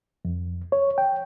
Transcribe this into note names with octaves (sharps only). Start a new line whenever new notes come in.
F2
C#5
G5